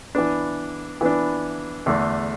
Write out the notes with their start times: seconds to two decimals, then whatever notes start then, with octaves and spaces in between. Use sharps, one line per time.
0.15 E3 B3 D4
1.01 E3 B3 D4
1.86 E2 D3 A3